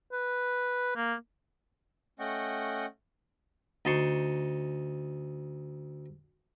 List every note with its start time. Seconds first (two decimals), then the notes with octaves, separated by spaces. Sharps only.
0.12 B4
0.96 A#3
2.19 A3 C#4 D#5 F#5 G5 C#6
3.85 D2 D#4 A5 C6 C#6